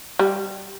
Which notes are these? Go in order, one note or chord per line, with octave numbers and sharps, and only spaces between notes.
G3